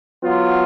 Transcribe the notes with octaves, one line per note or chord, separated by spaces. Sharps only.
F#3 B3 F4